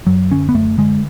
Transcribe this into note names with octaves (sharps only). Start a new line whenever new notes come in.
F#2 F#3
D3 C#4
B3
F#2 A3
D3 G#3